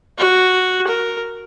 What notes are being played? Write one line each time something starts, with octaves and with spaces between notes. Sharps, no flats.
F#4
A#4